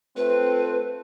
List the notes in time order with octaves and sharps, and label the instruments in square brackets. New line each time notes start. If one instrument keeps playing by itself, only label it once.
[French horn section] A3 C4 F4 [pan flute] B4